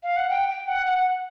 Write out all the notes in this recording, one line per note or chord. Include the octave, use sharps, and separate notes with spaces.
F5
F#5
G5
G5
F#5
F#5